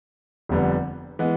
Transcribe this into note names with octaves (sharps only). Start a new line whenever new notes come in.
F1 F2 D3 G3 B3
E3 G#3 B3